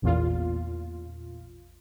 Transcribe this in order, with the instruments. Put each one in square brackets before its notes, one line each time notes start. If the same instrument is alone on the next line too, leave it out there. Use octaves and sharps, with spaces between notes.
[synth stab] A1 E2 A#2 F4